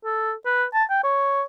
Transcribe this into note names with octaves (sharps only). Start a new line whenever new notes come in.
A4
B4
A5
G5
C#5